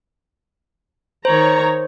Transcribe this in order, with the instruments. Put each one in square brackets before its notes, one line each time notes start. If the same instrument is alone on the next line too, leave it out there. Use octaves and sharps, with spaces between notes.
[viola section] D#3 C#5 A#5 [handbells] C5